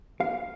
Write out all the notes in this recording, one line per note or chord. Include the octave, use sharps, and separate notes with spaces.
F5